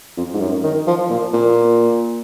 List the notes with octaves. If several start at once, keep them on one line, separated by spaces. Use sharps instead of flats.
F2
G#2
F#2
D#3
F3
A#2
A#2